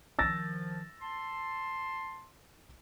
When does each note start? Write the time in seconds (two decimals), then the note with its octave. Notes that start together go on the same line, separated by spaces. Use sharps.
0.19 D#3 F3 E6 A6 A#6
1.01 A5 C6